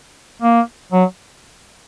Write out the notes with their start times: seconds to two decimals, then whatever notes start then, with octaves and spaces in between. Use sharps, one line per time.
0.42 A#3
0.92 F#3